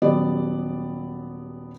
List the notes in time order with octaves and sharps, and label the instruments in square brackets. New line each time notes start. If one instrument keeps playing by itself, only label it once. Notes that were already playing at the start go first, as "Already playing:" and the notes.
[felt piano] D#1 F#3 B3 G4 D5